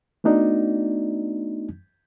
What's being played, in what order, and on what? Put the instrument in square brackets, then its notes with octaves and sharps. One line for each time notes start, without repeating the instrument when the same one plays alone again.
[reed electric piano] A3 B3 D4 D#4 F#4 D5